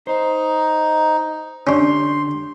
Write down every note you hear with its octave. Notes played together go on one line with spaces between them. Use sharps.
D#4 C5
D3 C#4 D4 G4 C6